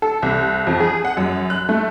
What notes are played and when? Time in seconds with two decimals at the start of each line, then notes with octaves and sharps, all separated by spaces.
0.02 A4
0.22 C2
0.67 F2
0.80 G#4
1.05 F#5
1.17 F#2
1.50 F#6
1.69 A3